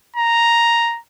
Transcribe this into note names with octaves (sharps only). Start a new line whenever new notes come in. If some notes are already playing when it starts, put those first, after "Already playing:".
A#5